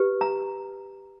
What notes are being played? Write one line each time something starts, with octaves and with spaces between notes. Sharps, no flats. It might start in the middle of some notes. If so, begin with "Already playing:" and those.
Already playing: G4 B4
A#5